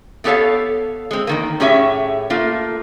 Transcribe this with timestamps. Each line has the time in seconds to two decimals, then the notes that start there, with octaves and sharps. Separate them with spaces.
0.24 A3 B3 G4 A4 C#5 F5
1.11 G#3 C4
1.27 E2 D#3 A#3
1.60 A2 C#4 G4 G#4 C#5 E5
2.30 A3 A#3 F4